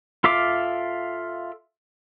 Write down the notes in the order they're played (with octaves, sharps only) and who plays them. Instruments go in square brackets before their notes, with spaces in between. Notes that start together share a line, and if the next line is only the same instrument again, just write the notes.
[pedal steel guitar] F4 A4 E5 F5 D6